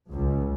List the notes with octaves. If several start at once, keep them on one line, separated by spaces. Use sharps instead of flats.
C#2